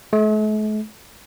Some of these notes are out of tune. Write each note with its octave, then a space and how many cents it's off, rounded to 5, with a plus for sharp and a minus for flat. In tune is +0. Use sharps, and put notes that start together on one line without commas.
A3 -45